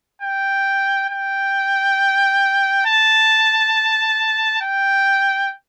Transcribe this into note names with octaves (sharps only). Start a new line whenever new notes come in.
G5
G5
A5
G5